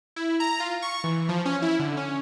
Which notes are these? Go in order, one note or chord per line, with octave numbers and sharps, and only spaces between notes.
E4
A#5
F4
C#6
E3
F3
C#4
E4
D3
C#4